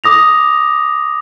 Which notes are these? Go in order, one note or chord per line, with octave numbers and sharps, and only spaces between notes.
D6 D#6 A#6 F7